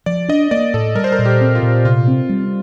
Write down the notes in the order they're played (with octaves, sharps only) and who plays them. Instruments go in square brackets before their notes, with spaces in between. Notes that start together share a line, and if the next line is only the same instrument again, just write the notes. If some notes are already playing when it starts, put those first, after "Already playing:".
[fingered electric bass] F3 [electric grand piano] D5
[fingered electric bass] D4 [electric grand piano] D#5
[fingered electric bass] A#3 [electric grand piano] D5
[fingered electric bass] A2 [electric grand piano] A4
[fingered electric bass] G3 [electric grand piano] A#4
[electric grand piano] C5
A#4
[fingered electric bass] A#2
[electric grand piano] G4
[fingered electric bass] C4
[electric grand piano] F4
[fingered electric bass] A#2
[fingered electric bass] C3 [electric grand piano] F4
[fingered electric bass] C4
G3